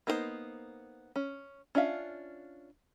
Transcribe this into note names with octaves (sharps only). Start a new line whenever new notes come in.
A#3 B3 D#4 A4 C5
C#4
C#4 D4 F4 E5 F5